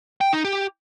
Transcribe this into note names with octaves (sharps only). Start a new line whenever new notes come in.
G5
D#4
G4